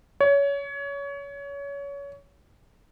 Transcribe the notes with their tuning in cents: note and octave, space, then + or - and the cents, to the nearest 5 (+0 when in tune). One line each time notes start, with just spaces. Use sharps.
C#5 +25